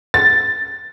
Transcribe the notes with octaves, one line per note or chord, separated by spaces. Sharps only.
A6